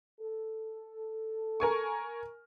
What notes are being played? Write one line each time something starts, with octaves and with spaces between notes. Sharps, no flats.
A4
A#4 G#5 C#6